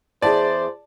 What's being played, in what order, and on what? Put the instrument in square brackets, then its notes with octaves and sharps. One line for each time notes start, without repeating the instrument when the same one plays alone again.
[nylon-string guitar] E2 E4 G#4 [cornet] C5 [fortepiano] D5 A5